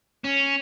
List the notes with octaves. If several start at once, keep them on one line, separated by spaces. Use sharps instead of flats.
C#4